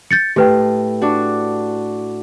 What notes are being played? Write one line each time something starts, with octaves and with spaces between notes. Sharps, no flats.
G6 A6 C#7
A2 G4 B4 G5
D4 F#4